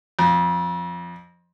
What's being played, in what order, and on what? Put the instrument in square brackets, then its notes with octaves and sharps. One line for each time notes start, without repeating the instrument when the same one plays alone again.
[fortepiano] F2